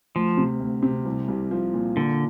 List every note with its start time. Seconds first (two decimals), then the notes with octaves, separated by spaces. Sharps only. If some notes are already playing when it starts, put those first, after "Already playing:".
0.15 D2 F3
0.38 C3
0.60 D2
0.83 C3
1.05 C2
1.28 C2
1.51 F3
1.74 A#2
1.96 A#2 D3